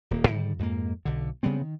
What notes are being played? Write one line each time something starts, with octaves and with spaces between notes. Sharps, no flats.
D#1 A#3
G#2 D3 D#3 G3
F2 G#2 G#3 A#3
B1 D3
C#3 G3 B3 C4
D#3